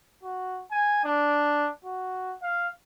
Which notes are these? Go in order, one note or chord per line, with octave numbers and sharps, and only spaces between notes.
F#4
G#5
D4
F#4
F5